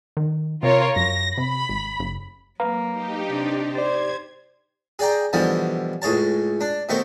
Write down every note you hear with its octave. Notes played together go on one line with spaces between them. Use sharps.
D#3
C3 F4 A#4 C#5
F#2 A#6
C3 B5
G#1
F#1
F#3 A#3 B4 F5 A#5
D#4 G4
C3 D4
C5 D5 G#6 A6
G#4 D5 G5 A#5
B2 D3 E3 F3 G3
C#2 A2 G#4 C#5 A5
D4
B2 D#3 A3 C4 C#6